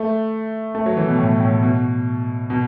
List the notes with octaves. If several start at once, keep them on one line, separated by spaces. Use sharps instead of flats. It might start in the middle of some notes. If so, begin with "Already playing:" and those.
Already playing: A3
A3
F#3
E3
B2
A2
A2
B2
B2